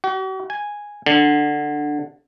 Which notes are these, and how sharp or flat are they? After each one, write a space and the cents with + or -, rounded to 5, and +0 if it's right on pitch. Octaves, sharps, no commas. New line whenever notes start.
F#4 +45
G#5 -5
D3 +10